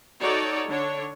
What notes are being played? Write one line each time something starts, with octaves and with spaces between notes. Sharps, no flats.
D#4 F#4 A4 C#5 D5
D3 D4 C#5